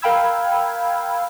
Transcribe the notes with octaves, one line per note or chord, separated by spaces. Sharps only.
A#4 F5 G5 B5 E6 G#6